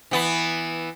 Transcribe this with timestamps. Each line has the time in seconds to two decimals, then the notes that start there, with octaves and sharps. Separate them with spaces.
0.11 E3 B3